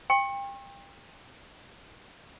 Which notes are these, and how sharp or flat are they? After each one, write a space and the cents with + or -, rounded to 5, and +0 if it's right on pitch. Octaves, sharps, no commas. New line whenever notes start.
G5 +30 C#6 -45